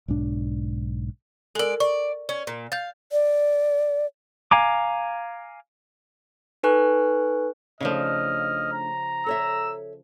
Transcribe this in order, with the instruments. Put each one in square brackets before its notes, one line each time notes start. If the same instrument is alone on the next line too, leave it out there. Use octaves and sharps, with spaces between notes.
[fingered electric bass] B1 G#2 D4
[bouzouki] G#3 D5 [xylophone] A4 A#4
[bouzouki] D5 [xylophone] C#6
[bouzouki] C#4 [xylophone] D5
[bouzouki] A#2
[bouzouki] F5 [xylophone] G6 A6
[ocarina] D5
[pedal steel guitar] F5 G#5 A#5 D6
[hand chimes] D#4 A4 B4 G#5 C#6 F#6
[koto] C#3 F3 [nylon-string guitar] A3 D4 D#4 [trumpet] D#5 [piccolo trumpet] F6
[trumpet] A#5
[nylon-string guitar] A4 C#5 E5 [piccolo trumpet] E6